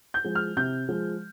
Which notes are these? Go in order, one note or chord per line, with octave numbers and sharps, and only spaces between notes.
G6
F3 G#3
F6
C3 G6
F3 G#3